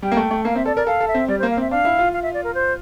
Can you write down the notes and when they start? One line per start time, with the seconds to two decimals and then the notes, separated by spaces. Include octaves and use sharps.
0.02 G3 G5
0.12 A#3
0.17 A3
0.31 A3
0.45 A#3 F5
0.55 C4 E5
0.66 A4 D5
0.76 A#4 D5
0.87 A4 F5
1.01 A4
1.08 E5
1.14 C4
1.28 G3 D5
1.39 A#3 C5
1.50 F5
1.57 C4 E5
1.71 D4 F5
1.85 E4
1.99 F4
2.13 F5
2.23 E5
2.34 D5
2.44 A#4
2.54 C5